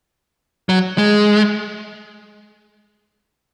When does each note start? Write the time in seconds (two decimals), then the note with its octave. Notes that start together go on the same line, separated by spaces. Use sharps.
0.69 F#3
0.98 G#3